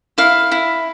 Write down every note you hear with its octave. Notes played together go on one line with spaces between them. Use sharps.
E4 F5
E4